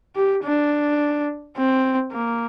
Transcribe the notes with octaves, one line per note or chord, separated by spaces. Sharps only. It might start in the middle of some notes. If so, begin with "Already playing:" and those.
G4
D4
C4
A#3